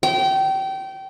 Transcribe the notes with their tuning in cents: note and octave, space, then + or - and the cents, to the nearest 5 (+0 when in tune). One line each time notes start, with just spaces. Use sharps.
G5 -25